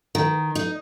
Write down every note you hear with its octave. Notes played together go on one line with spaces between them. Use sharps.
D#3
D#4